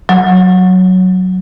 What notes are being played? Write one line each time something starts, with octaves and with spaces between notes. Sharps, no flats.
F#3